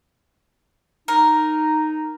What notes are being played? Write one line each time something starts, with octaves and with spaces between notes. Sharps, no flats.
D#4 A#4